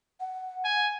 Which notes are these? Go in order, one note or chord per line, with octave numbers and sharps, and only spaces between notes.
F#5
G#5